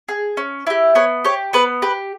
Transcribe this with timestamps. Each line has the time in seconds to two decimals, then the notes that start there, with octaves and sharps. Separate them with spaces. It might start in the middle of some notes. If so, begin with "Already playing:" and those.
0.08 G#4
0.37 C#4
0.67 E4 G4
0.95 B3 C#5
1.25 G4 C#5
1.53 B3 B4
1.82 G4 B4